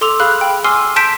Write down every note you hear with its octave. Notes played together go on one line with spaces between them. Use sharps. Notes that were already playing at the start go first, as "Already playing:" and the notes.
A4 C6 D6 E6 F7
G#4 F5 B5 F6 F#6
G5 B5
G#5 C6 D6 E6 F6 C7
A5 C6 G6 B6 D7 E7